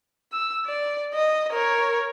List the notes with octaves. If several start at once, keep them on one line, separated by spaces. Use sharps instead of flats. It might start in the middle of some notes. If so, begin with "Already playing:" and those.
E6
D5
D#5
A#4 C#5